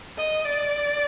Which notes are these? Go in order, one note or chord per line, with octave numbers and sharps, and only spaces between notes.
D#5
D5